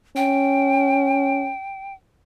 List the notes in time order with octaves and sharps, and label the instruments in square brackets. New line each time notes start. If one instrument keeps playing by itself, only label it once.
[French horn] C#4 [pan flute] G5